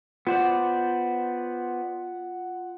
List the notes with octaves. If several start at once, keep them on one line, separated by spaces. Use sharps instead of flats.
B3 F4 C5 D5 F#5